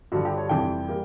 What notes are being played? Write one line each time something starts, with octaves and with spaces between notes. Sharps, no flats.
G2 D3 F3 F#4
G4
C#5
F2 C3 E3 G3 G5
G3 A#3